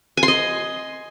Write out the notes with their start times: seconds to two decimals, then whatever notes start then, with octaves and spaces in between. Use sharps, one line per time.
0.17 G#5
0.23 C6
0.28 D#5